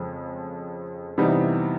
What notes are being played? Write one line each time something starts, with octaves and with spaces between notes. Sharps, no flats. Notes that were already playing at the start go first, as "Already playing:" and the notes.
Already playing: F2 C#3 F3 G#3
C3 E3 G3 B3 D#4